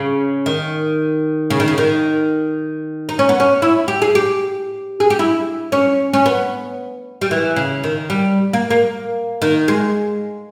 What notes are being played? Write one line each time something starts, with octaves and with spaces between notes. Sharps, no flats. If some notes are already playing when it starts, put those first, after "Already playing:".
Already playing: C#3
D#3
C#3
D#3
C#3
D#3
D#4
C#4
B3
C#4
E4
G4
G#4
G4
G#4
G4
E4
C#4
C#4
B3
G3
E3
C#3
D#3
G3
A#3
A#3
D#3
G#3